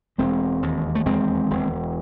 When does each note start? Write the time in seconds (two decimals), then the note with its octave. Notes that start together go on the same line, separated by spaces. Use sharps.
0.18 E1 G#3 C4
0.63 D#2
0.95 A3
1.06 E1 G#3 C4
1.50 E1